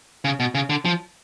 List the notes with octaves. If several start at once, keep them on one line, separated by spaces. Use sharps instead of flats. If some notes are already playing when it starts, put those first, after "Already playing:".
C#3
B2
C#3
D3
F3